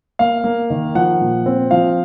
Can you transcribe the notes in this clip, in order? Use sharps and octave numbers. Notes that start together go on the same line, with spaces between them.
A#3 F5
A#3
D#3
F3 F#5
A#2
C4
F3 F5